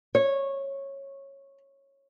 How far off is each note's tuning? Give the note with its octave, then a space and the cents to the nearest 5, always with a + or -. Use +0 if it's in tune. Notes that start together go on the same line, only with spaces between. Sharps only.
C#5 -15